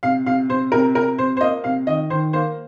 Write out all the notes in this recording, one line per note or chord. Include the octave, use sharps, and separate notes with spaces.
C3 F5
C3 F5
C3 C5
C3 A#4
C3 A#4
C3 C5
C5
A#3 D#5
C3 F5
D#3 D#5
D#3 C5
A#3 C5